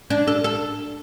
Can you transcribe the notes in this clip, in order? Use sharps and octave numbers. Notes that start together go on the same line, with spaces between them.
D4
A4
A4